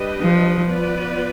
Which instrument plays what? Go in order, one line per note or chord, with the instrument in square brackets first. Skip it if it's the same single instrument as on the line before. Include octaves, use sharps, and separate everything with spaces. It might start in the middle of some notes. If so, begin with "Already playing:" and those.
Already playing: [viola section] G3 D4 G4 B4 D#5
[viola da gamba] F3
[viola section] B3 F4 B4 D5